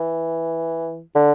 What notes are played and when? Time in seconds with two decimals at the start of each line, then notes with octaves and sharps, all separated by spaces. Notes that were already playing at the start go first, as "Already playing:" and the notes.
Already playing: E3
1.15 D3